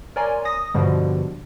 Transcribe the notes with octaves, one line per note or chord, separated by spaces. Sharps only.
A#4 C#5 D5 G#5 A#5 C6
D#6 A#6
G2 B2 D3 F3 G3